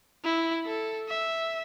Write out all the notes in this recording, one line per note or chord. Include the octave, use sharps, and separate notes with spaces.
E4
A4
E5